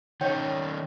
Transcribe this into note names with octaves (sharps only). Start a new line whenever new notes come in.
D#3 C#4 C#5 G5